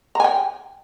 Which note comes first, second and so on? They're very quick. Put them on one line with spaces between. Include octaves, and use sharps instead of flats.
A#5 G#5 G5